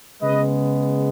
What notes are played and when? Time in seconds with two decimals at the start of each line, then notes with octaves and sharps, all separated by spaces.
0.22 C#3 G#3 B3 B4 D#5